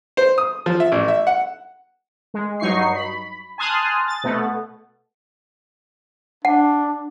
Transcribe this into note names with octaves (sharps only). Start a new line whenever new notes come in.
C5
D#6
F3
E5
A1
E5
F#5
G#3
G2 F#3 D#4 C#6 C7
B5
G#5 A5 C6 D#6 F6 F#6
A6
B2 A3 B3
D4 F#5